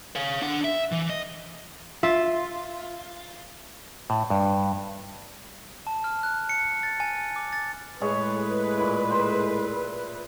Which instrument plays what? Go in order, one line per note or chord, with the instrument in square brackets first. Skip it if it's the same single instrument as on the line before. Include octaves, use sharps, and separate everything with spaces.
[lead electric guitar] C#5 F5
D4 F#5
E5
E3
D#5
[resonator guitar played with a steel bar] F4 [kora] E5
[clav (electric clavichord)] A2
G2
[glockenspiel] A5
F6
F#6
C#7
A6
G#5
D6
A6
[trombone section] A2 G#3 [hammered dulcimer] G#4 C#5 E5 [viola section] B4
[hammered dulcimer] A#2 E4
C5 C6